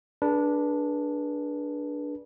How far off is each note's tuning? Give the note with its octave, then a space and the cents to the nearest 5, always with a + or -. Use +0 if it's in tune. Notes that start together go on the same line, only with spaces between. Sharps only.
D4 +0 G#4 +15 B4 -30